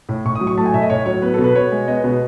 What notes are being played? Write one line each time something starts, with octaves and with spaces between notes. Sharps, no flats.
A2
A2 C#6
D#6
F#3
C#6
A3 A5
G#5
A2 E5
D#5
A2 C#5
F#3 C#5
B3 B4
B2 A4
B4
B2 C#5
G#3
B3 D#5
B2